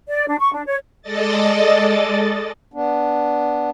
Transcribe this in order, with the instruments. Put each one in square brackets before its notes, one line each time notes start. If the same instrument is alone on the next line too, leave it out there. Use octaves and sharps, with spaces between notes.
[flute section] D5
D4
C#6
D4
C#5
[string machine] G#3 A4 D5 D#5 A6
[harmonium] B3 D4